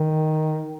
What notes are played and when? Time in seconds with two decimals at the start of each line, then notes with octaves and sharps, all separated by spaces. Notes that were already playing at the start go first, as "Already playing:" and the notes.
Already playing: D#3